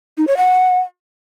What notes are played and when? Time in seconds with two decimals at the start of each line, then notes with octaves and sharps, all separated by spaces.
0.18 D#4
0.27 C#5
0.37 F#5